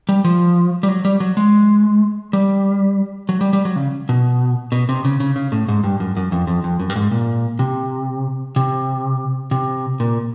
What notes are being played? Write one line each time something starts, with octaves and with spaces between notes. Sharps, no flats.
G3
F3
G3
F#3
G3
F#3
G#3
G3
F#3
G3
G3
F#3
C#3
B2
B2
C3
C#3
C#3
C#3
A2
G#2
G2
F#2
F#2
F2
F2
F2
F#2
G2
G#2
A#2
C3
C3
C3
A#2